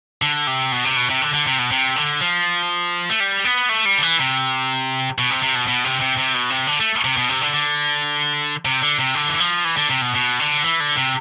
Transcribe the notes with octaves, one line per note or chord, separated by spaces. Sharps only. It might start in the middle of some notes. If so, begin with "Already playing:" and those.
D3
C3
B2
C3
B2
C3
D3
D3
C3
B2
C3
D3
F3
A3
G3
B3
A3
G3
D3
E3
C3
B2
C3
C3
B2
B2
C3
C3
C3
B2
C3
D3
A3
C3
B2
C3
D3
D3
C3
D3
C3
D3
E3
F3
E3
D3
C3
B2
B2
D3
E3
D3
C3